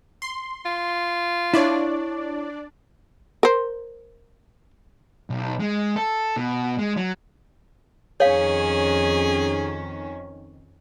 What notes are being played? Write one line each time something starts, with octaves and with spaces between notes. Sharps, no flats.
C6
F4
D4 E4 C#5 D5
A#4 C5
B1
G#3
A4
B2
G#3
F#3
F2 D#3 C#4 G#4 C#5 F5